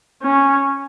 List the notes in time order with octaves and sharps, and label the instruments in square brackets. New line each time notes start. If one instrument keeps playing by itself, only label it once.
[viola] C#4